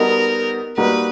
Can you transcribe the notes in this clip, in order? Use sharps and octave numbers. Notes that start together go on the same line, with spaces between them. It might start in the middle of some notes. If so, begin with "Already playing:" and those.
Already playing: G3 B3 D#4 F#4 A4 A#4
G3 A#3 D#4 F#4 B4